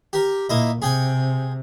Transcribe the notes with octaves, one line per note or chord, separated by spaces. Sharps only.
G4 A#4
A#2 A#3 E4 D#5
C3 G#4 G5 G#5